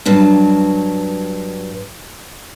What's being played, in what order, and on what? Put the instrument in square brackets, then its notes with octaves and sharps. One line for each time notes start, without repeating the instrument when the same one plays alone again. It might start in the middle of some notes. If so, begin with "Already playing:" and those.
[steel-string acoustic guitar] G2 F#3 A5